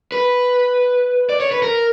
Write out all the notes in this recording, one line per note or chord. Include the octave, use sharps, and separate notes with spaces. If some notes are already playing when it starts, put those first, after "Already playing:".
B4
D5
C#5
B4
A#4